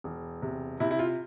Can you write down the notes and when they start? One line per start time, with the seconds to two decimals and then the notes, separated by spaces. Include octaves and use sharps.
0.04 E1
0.42 C3
0.80 C3 E4
0.91 E4
0.99 F4